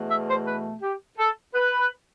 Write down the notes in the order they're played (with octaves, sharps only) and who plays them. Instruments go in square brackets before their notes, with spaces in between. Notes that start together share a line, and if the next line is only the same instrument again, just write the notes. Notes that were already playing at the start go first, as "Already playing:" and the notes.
Already playing: [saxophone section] E2 B2 A3
E5
C5
B4
G4
A4
B4